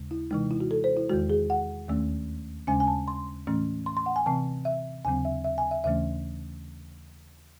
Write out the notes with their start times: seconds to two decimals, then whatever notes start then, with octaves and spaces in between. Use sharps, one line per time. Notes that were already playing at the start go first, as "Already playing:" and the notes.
Already playing: D#2 C#3 G#3
0.11 E4
0.31 C3 E3 G#3 D#4
0.51 E4
0.60 F#4
0.71 A4
0.84 C5
0.97 E4
1.10 E2 D#3 G#3 F#4
1.30 G#4
1.50 F#5
1.88 D#2 D#3 A3 C#4
2.67 D#2 C#3 G#3 C#4 G#5
2.80 G#5
2.87 A5
3.08 C6
3.47 A2 E3 A3 C#4
3.86 C6
3.97 C6
4.06 F#5
4.16 G#5
4.26 C3 E3 C4 A5
4.65 E5
5.05 D#2 C#3 F#3 C4 G#5
5.25 E5
5.44 E5
5.58 G#5
5.71 E5
5.84 D#2 C#3 E3 A3 C#4 E5